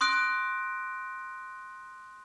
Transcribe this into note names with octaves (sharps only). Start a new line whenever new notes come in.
C6 D#6 F#6 A#6 D7